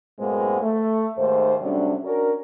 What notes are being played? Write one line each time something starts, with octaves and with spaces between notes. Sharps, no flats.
F#2 A2 G#3 A#3 B3 C5
A3
D#2 G#2 A3 C5
C3 F#3 G3 A3 C#4 D4
C#4 D4 F#4 A#4